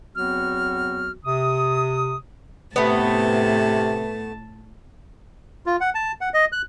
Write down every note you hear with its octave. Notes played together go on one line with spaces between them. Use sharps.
E2 F#3 B3 C4 F#4 F6
C3 D#6
A2 C3 A3 B3 A5
F4
F#5
A5
F#5
D#5
F#6